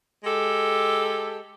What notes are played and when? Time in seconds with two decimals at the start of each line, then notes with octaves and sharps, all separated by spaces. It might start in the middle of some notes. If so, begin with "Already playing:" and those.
0.24 G#3 G4 A4